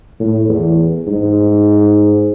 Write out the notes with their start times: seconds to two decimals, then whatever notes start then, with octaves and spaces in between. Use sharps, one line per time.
0.20 A2
0.49 E2
1.07 G#2